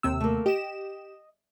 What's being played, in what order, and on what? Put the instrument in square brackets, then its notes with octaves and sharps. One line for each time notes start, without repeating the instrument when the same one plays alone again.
[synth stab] D#2 C3 E6
[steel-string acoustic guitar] A3 A#3
[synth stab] G4 E7 [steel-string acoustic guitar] D#5